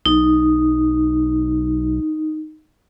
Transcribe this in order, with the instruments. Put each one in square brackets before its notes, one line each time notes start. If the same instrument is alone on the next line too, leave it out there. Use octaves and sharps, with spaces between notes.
[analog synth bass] B1 [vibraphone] D#4